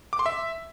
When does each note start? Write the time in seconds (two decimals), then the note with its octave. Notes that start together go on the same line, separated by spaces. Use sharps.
0.13 D6
0.19 C6
0.26 E5